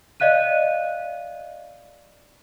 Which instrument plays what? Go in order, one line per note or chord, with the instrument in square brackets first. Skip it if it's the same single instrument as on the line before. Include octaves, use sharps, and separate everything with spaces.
[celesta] D5 D#5 F5 F#6 D#7